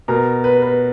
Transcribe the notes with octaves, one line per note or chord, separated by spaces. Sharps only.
B2 A#4
B4
B4